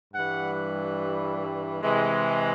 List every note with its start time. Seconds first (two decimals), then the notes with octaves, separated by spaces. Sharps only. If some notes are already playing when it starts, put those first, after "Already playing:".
0.13 G2 E3 G3 F#5
1.83 C3 E3 G#3